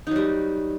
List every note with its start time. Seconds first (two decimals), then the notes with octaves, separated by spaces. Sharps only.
0.07 D#4
0.11 F#3
0.16 G3